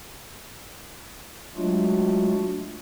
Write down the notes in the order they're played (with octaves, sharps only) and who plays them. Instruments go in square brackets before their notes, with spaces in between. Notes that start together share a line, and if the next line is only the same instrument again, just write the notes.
[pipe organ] F#3 G#3 A3 D4 F4 F#4